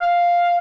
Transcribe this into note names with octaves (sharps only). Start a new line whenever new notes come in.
F5